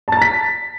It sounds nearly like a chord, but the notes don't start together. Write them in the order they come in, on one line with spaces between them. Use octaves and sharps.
A5 A6 A#5 B6